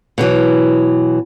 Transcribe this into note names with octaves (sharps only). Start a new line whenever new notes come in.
B2 D3 E3 F#3